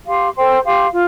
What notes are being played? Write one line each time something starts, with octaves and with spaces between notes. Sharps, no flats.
G4 F5 C6
A4 C5 G5 C6
G4 F5 C6
F4